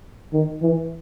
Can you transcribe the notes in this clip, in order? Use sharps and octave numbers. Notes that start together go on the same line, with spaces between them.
D#3
E3